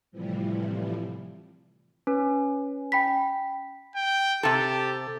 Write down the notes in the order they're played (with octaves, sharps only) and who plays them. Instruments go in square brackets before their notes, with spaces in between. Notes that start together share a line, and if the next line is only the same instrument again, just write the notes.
[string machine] A2 C3 E3 F3 G3
[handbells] C#4 [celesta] B4
[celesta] G5 B5 B6
[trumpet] G5
[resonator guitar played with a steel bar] C3 A4 [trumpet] G4